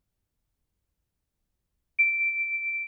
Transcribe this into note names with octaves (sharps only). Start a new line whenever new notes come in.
D7